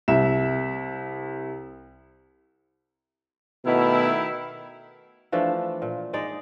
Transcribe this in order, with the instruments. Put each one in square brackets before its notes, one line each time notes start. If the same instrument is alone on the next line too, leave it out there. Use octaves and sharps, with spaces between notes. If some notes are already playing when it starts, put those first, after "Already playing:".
[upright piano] C2 E5 E7
[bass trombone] B2 [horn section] D#3 A3 E4
[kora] E3 F3 A3 D4
A#2
G#3 D#4 D5